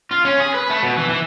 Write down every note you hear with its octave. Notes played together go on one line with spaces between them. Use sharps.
F4
C#4
G#4
B4
A3
B2
E3
E3